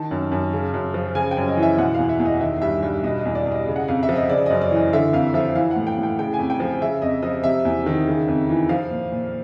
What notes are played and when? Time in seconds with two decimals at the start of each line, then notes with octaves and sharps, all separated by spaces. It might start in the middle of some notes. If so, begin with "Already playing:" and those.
Already playing: D#3 A5
0.11 F#2
0.32 F#2
0.53 C#3
0.74 F#2
0.94 F3
1.15 C#3 G#5
1.31 G5
1.37 F#2
1.48 D#5
1.57 E3
1.63 E5
1.78 B2 F#5
1.94 E2 F5
2.09 E5
2.20 E2
2.25 D#5
2.41 D#3 E5
2.62 G2 E5
2.83 G2 E5
3.03 B2 D#5
3.19 D#5
3.25 E2
3.35 D5
3.46 E2
3.52 D#5
3.67 C#3
3.76 F#5
3.88 F2 F5
4.03 E5
4.09 F3
4.16 D#5
4.29 C#3 D5
4.46 F#2 D#5
4.61 D5
4.71 E3
4.76 D#5
4.93 D3 E5
5.13 F2 F5
5.34 F3 E5
5.55 E3 F5
5.71 F#5
5.77 A2
5.87 G5
5.98 A2
6.03 G5
6.19 C#3 G5
6.34 G#5
6.39 F2
6.50 G5
6.60 F3
6.82 C#3 E5
7.02 F2 D#5
7.23 F3 D#5
7.44 C3 E5
7.65 E2
7.86 D#3
8.07 C#3
8.28 F2
8.49 E3
8.69 F3 F5
8.90 A#2
9.12 A#2